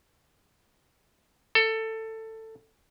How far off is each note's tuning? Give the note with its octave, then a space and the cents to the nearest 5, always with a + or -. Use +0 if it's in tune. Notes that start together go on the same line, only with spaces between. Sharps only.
A4 +15